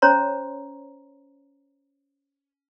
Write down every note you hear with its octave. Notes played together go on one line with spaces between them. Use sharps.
C#4 C5 C#5 A#5 C6